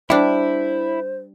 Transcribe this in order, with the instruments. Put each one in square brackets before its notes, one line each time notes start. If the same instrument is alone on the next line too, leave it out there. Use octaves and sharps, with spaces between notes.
[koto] G3 D4 [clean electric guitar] E4 [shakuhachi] C5